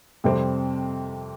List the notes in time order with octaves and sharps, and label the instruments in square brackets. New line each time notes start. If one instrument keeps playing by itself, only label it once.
[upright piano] F2 C3 G3 C4